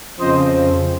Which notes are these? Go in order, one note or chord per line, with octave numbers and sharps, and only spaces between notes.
F2 C#3 F3 C4 C5 D#5